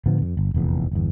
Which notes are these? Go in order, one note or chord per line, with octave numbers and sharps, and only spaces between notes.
A2 D3 F3 B3
F2
G1
F1 A#1 E2
G1 E2